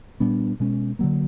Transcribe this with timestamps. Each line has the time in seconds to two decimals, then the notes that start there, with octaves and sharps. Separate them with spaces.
0.20 A#2 G3 B3 D4
0.60 B2 G#3 C#4
0.99 D3 F#3 A#3